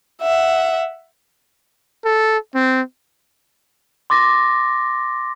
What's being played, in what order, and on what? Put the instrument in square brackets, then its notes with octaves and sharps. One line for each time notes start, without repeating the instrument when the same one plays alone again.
[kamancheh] E5 F#5
[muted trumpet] A4
C4
[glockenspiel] C6 D6 A6 A#6